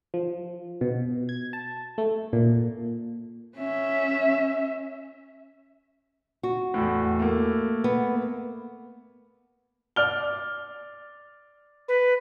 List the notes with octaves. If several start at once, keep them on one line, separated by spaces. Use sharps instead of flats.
F3
B2
G#6
A5
A3
A#2
C#4 E5
F#4
E2 A2
A3 A#3
B3
D5 F6 G7
B4